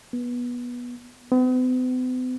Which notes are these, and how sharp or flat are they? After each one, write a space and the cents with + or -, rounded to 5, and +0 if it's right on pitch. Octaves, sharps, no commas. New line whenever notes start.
B3 -20
B3 +45